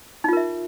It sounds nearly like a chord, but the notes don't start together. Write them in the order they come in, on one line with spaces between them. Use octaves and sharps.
D#4 F4 A#4 E5